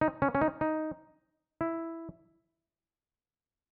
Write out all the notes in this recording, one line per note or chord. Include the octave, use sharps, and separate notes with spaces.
D#4
C#4
C#4
D#4
D#4
E4